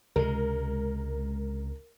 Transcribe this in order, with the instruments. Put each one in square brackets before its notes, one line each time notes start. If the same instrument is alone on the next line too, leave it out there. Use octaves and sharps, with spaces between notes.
[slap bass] C#2 C3 G#3 [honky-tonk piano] A#4